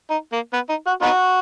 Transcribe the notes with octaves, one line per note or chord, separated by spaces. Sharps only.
D#4
A#3
B3
D#4
F#4
B3 D#4 F#4